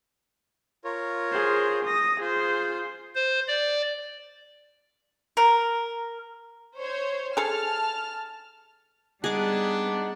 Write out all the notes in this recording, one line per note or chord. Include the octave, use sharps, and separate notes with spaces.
F4 A#4 C#5
G#4 C5
D#6 A#6
F4 G#4 C5
C5
D5
A#4
C5 C#5
G#4 A4 A5 F6
G3 B3 D4 D#4 G#4 F#5 D6